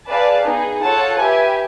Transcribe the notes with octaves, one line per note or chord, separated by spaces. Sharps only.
G#4 B4 D5 F5 A5
B3 D#4 G#4
F4 A4 C#5 F#5 A5
G4 B4 E5 G#5